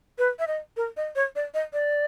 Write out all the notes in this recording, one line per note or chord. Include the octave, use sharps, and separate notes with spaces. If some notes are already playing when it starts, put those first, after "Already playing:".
B4
E5
D#5
A#4
D#5
C#5
D5
D#5
D5